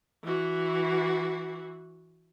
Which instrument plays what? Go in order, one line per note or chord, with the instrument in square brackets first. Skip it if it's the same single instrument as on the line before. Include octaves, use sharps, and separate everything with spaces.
[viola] E3 F#4